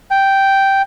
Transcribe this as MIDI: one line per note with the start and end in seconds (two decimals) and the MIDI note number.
0.11 0.82 79